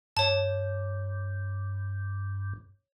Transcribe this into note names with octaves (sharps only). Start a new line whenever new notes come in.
G2 C#5 A5